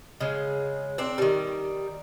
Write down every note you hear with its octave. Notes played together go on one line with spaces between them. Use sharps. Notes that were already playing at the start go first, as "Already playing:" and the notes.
C#3 G#3
C4 D4
D#3 G3